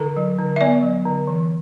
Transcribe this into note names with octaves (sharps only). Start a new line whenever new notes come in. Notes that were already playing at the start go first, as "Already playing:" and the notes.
Already playing: D3 A4
F#3
D3
E5
B3 D5
F#3
D3
E3